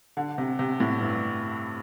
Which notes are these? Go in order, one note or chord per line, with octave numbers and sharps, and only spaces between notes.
D3
C3
C3
A2
G2